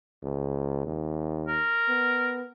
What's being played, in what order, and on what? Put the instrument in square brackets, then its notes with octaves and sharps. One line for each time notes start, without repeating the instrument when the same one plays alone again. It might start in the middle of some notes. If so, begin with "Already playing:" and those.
[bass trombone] C#2
D#2
[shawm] A#4
[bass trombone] B3